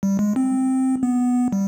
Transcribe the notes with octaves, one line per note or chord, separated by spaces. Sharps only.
G3
G#3
C4
B3
G3